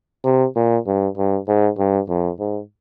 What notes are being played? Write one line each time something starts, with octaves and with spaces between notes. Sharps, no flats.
C3
A#2
G2
G2
G#2
G2
F2
G#2